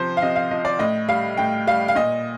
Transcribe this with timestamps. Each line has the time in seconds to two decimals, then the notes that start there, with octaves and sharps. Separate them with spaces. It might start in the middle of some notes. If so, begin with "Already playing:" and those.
Already playing: C3 F3 C5
0.17 F5
0.22 C3 D#5
0.36 F5
0.51 F3 D#5
0.65 D5
0.79 A2 D#5
1.09 G3 F5
1.37 A2 G5
1.67 G3 F5
1.88 F5
1.96 A#2 D#5